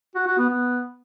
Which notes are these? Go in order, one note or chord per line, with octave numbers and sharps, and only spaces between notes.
F#4
F#4
B3
B3